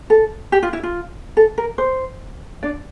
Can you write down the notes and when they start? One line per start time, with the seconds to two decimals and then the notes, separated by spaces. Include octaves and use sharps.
0.10 A4
0.52 G4
0.63 F4
0.73 E4
0.83 F4
1.37 A4
1.58 A#4
1.78 C5
2.63 D4 D5